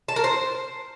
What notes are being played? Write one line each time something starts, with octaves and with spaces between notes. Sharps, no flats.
A5
A#4
C5